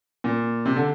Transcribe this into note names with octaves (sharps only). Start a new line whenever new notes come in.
A#2
C3
D3